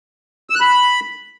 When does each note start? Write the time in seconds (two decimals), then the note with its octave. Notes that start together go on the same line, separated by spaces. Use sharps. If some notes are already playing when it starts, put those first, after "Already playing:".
0.50 E6
0.55 F#6
0.61 B5